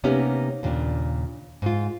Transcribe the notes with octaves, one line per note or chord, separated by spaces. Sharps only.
C3 A#3 B3 C#4 D#4 G4
D#2 A#2 C#3 D4
G#2 F4